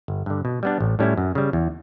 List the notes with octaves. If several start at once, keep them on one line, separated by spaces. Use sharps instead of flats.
G1
G2 D3
B2
G3 B3 D4
A1
A2 G3 C#4 E4
F#2
C#3 G3
E2